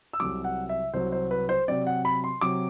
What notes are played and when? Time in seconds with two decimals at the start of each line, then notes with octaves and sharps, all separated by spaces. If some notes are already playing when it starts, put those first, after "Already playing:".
0.13 E6
0.20 C2 C3 F#3 D6
0.44 F#5
0.69 E5
0.94 C2 C3 F#3 C5
1.12 C5
1.31 B4
1.49 C5
1.68 C3 F#3 C4 D5
1.87 F#5
2.05 B5
2.24 C6
2.41 C3 F#3 C4 D6